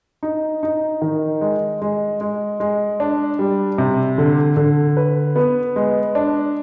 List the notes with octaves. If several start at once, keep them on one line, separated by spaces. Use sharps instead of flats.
D#4
D#4
D#3
G#3
G#3
G#3
G#3
D4
G3
C3
D3
D3
B4
B3
G#3
D4